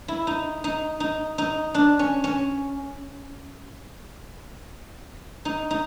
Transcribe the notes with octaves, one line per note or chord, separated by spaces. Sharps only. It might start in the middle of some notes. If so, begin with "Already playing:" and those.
E4
D#4
D#4
D#4
D#4
D4
C#4
C#4
D#4
D#4